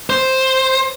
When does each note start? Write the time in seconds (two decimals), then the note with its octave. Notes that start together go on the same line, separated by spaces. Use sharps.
0.10 C5